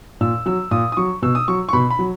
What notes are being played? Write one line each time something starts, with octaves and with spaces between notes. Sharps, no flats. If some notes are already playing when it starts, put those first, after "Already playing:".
A#2 E6
F#3 E6
A#2 D#6
D#6
F#3 C#6
B2 E6
D#6
F#3 C#6
C#6
B2 B5
B5
F#3